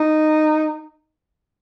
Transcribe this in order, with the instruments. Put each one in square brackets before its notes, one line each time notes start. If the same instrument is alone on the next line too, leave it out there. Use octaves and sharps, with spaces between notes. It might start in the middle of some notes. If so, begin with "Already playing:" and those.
Already playing: [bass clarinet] D#4